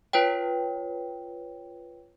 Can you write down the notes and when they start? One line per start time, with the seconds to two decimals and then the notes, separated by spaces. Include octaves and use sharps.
0.13 F4 B4 C#5 G5